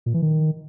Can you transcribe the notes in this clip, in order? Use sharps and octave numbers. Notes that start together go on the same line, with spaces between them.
A#2
E3
D#3